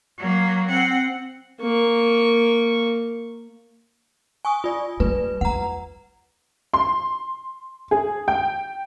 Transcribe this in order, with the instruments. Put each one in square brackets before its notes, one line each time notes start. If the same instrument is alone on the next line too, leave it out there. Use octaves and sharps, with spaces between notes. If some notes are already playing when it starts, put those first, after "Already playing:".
[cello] F#3 A#3
C4 F#5
[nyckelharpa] A#3 C#6
[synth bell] G#5 C#6 D#6
F4 D5
[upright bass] G3 [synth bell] B4
[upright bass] E2 [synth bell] F#5 A#5
[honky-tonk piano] C6
G#4
G5